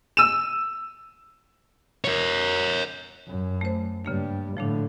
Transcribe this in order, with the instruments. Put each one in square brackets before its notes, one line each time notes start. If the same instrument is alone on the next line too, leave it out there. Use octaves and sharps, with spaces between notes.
[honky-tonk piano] E6 D#7 E7
[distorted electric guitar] A#4 C#5
[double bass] F#2
[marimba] A3 C5
[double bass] G2 G3 [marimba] C#3 A#3 D4
[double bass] A2 D3 [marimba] F3 A3 D4